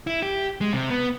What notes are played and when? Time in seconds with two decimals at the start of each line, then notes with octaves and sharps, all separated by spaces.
0.07 E4
0.22 G4
0.61 G#3
0.73 C3
0.90 B3